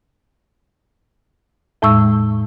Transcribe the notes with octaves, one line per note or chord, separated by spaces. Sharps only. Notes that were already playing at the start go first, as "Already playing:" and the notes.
E2 A2 G#3 C#6 E6